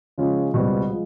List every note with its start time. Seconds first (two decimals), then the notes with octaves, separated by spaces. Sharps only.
0.18 C#3 F3 G#3 C#4 F4
0.53 C#2 B2 G3 C4
0.90 F3 G#3